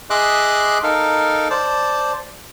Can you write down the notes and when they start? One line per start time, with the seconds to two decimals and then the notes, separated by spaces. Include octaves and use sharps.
0.10 G#4 D#5 E5 C6 D6 F#6
0.83 D#4 A4 A#4 F5
1.50 C5 D5 A5